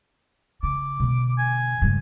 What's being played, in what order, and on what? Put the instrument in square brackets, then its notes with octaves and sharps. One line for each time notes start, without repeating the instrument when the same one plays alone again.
[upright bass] C#3 [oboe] D6
[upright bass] B2 D3
[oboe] G#5
[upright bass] G2 C#3